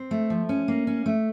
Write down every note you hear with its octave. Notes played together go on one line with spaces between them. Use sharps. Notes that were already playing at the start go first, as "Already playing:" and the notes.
Already playing: C4
A3
F3
C#4
A#3
C#4
A3